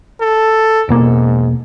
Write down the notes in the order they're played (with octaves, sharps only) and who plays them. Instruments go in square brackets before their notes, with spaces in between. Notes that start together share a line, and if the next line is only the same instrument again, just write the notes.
[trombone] A4
[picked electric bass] E1 B2 A#3 [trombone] G#2